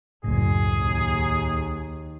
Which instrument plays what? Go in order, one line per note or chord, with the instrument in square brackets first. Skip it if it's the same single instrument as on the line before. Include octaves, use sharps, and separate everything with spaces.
[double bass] F#1 [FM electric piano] C#2 A2 [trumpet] G#4
[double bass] D#2